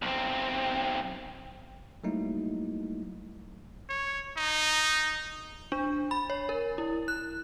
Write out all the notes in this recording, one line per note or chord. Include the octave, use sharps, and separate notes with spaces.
B1 C4
F#3 G3 A3 A#3 D#4 E4
C#5
D#4
D4
B5
C#5
A#4
E4
F#6